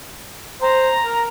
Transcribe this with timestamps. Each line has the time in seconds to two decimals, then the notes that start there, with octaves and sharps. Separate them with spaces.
0.62 C5 A#5
1.05 A#4